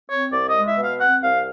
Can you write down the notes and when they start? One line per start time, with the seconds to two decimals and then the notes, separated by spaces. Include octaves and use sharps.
0.09 C4 C#5
0.32 C2 D5
0.49 D#5
0.55 G#3
0.66 E5
0.77 B2
0.83 F5
1.00 C4 F#5
1.23 C2 F5